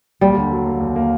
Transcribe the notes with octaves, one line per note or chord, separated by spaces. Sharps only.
D#2 G3
D3
F#3
A#3
D#2
A#3